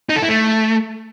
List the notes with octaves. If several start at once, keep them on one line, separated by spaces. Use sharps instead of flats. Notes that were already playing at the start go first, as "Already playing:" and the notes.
D#4
A4
E4
A3